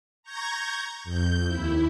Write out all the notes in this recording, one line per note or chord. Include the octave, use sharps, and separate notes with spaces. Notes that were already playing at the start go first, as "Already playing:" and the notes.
A#5 C#6 G6 G#6 A#6
F2 G6
D#2 E4